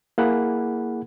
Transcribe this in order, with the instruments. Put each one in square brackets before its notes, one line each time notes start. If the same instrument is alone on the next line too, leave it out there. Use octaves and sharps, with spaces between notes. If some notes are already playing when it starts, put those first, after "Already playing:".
[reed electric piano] A#3 E4 G#4 F#5 B5